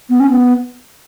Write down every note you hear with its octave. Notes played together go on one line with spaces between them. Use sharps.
B3
C#4
B3